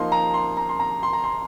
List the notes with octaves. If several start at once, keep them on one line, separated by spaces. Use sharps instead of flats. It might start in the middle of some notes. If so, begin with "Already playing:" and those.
Already playing: F3 A#3 D#4 C6
A#5
C6
A#5
C6
A#5
C6
A#5
C6